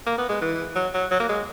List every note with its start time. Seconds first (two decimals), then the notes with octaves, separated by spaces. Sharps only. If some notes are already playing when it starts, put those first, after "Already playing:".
0.07 A#3
0.18 B3
0.29 G#3
0.41 E3
0.75 F#3
0.94 F#3
1.11 F#3
1.20 A#3
1.29 G#3